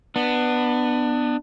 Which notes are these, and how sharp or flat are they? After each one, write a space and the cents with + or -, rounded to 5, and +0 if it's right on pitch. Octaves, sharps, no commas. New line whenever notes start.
B3 +0 D4 +20